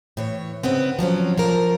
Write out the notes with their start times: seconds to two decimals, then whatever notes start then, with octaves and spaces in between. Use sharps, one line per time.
0.17 A2 E3 C#5
0.63 G#2 C#3 B3 C4
0.99 F3 F#3 C4 C#4
1.38 F3 F4 A#4